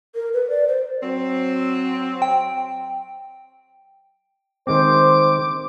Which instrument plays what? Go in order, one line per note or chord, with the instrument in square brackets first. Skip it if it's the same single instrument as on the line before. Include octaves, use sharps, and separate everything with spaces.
[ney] A#4
B4
D5
C5
[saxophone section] F#3 C4
[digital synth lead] G5
[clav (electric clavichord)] D#3 G#3 C4 [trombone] C5 [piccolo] D6